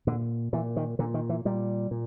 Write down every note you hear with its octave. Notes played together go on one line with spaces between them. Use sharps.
A#2 D3
A#2 E3
D#3
A#2 D3
D#3
E3
A#2 G3
A#2